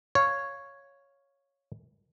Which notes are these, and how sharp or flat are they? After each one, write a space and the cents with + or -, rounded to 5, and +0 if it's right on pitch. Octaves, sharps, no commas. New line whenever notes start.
C#5 +0 F5 +5